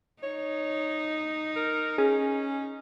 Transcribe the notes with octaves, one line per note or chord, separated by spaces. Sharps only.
D#4 C#5
A#4
C#4 G#4